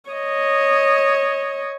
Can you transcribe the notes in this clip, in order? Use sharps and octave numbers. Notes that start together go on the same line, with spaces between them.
C#5 D#5